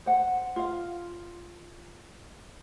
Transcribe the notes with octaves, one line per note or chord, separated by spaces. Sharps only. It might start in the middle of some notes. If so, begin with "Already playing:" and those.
C5 F#5
F4 F5